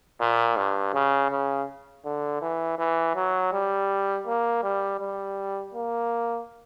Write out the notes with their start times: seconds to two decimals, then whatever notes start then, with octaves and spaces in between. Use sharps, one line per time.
0.20 A#2
0.57 G2
0.94 C#3
1.31 C#3
2.05 D3
2.42 E3
2.79 E3
3.15 F#3
3.53 G3
4.27 A#3
4.63 G3
5.00 G3
5.74 A#3